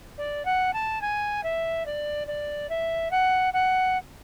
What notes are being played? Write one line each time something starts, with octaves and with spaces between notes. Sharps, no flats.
D5
F#5
A5
G#5
E5
D5
D5
E5
F#5
F#5